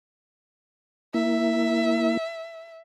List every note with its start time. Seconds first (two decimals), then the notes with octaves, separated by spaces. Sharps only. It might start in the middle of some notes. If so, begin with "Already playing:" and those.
1.14 A#3 E4 E5